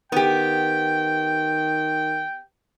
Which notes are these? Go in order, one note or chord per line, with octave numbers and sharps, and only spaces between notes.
D#3 B3 G4 G5